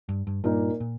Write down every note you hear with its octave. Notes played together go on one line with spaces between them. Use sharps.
G2
G2
G2 A#2 A#3 D#4 A#4
A#2